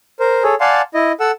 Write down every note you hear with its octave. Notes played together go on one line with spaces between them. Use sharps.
A#4 C5
G#4 A4 C#5
D5 F5 F#5 G#5 A5 C6
E4 D#5
A4 F#5 E6